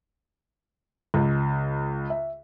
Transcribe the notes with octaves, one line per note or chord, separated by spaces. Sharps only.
C#2
E5